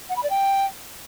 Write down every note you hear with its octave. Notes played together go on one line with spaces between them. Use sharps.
F#5
B5
D5
G5